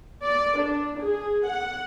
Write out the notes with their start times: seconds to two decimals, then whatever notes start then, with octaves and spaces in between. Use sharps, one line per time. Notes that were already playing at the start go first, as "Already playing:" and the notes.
0.24 D5
0.59 D4
1.00 G#4
1.46 F#5